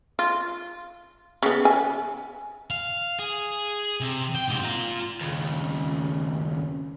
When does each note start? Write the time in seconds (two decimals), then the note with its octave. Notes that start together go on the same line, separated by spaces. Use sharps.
0.19 F4
1.43 C#3 B3
1.65 G#5
2.70 F5
3.19 G#4
4.01 C3
4.35 G5
4.48 G#2 C3
4.63 F4 A#5
5.21 D#2 C#3